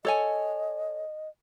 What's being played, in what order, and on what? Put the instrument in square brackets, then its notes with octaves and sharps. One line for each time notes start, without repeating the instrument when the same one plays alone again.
[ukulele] A4 C#5 G#5 [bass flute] D#5